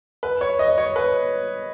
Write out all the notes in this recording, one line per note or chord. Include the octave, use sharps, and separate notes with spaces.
B4
C#5
D#5
C#5
B4